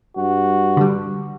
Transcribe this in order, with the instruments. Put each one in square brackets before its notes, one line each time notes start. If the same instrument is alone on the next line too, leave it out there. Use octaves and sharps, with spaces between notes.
[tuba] G2 [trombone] F#4
[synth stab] D3 G3